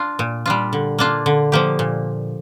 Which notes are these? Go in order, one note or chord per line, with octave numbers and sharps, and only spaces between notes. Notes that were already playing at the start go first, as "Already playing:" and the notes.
Already playing: D4 F4
A#2
G3 D4 F4
D3
A#3 D4 F4
D3
F3 A#3 G4
A#2